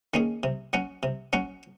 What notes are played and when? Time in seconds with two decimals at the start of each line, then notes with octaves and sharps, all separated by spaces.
0.14 D#3 A#3 C#4 G#4
0.43 C3
0.73 F#3 C#4 F#4
1.03 C3
1.33 F#3 C#4 F#4